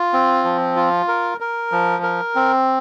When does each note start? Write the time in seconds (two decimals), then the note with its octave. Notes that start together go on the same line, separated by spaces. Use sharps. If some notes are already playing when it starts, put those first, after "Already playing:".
Already playing: F4
0.13 C4
0.44 F3
0.76 F4
1.08 A#4
1.40 A#4
1.72 F3
2.03 A#4
2.35 C4